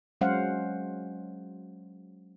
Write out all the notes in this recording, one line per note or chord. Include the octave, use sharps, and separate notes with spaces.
F#3 G#3 C#4 C5 F5 F#5